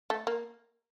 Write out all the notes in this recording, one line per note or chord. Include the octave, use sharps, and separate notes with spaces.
A3
A#3